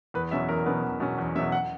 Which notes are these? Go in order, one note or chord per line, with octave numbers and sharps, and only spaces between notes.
E2 B4
B2 F#3 C#4 E5
E2 A#4
B2 F#3 C#4 B4
E2
B2 F#3 C#4
E2
B2 F#3 C#4 E5
F#5